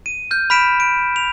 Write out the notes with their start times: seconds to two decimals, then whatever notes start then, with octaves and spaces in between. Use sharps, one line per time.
0.06 D#7
0.31 F6 G6
0.50 B5 F6 B6 D7 E7
0.80 D7
1.16 F7